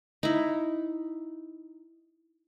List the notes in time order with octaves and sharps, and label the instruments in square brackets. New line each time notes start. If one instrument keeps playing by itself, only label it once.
[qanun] D#4 E4